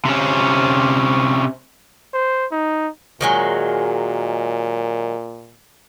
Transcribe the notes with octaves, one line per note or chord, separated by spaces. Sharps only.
C3 C#4
C5
D#4
A#2 D#3 F#3 G#3